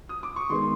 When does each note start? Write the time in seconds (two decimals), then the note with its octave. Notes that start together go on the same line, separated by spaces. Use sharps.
0.09 D#6
0.23 D6
0.36 C#6
0.50 D#3 G#3 B3 C6